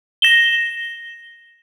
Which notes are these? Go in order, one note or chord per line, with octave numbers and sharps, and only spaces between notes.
A#6 E7 G7